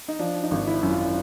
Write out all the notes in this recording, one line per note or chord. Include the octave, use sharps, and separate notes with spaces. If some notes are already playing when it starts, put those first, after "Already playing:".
D#4
F3 D4
D#4
G#1
E4
F#2
F4